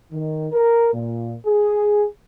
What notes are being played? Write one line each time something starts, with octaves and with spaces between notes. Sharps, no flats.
D#3
A#4
A#2
G#4